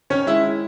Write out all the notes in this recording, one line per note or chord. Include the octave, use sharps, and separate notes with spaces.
D#3 C#4 C#5
G#3 E4 E5
E4